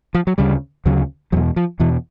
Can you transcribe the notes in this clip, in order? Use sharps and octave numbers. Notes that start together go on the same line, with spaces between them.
F3
F#3
D2 C#3 G3
D2 C#3 F#3
E2 B2 F#3
F3
E2 B2 E3